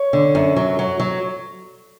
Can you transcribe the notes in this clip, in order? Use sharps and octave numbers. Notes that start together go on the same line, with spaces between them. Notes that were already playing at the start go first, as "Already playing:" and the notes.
Already playing: C#5
D3
F#2
F#3
F#3
F#3